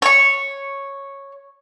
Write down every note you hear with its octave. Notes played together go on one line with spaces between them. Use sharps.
C#5 C#6